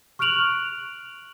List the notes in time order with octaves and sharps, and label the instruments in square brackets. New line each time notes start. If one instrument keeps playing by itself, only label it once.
[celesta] C#6 F6 F#6 D7 F7 F#7